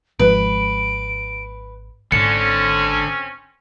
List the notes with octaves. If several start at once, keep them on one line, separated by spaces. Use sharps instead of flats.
G#1 F3 G#3 B4 D7
G#1 D3 C4 C#4 C#7